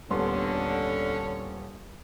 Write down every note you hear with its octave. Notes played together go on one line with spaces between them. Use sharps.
D#1 D3 B3 C#4 C6